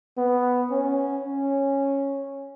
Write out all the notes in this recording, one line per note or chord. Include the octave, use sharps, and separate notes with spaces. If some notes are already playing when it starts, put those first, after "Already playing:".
B3
C#4
C#4